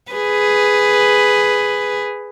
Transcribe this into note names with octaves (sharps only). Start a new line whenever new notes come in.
G#4 B4